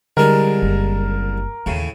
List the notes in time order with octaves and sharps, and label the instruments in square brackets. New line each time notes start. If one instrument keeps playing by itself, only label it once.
[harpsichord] C2 G#3 D4 [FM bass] D3 [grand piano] A#4
[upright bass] F#1
[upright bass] D#2 E3 [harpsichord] A2 C#3